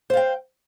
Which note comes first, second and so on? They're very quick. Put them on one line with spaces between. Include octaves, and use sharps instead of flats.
C5 F5 G5